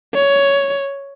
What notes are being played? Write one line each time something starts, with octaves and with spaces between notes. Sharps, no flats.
C#5